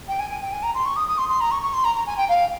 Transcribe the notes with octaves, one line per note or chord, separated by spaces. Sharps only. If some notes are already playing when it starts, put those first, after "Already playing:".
G5
G#5
G#5
G5
G#5
A#5
C6
C#6
D#6
D#6
C6
C6
A#5
C#6
C#6
C6
A#5
A#5
G#5
G5
F5